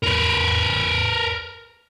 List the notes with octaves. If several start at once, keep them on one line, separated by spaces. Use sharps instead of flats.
A#4 B4